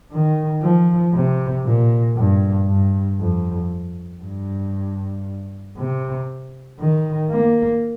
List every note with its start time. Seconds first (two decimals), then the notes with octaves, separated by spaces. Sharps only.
0.12 D#3
0.62 F3
1.13 C3
1.65 A#2
2.16 G2
2.67 G2
3.19 F2
4.22 G2
5.76 C3
6.79 D#3
7.30 A#3